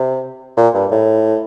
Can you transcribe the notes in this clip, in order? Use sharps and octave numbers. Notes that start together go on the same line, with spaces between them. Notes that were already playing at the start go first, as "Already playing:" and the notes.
Already playing: C3
A#2
G2
A2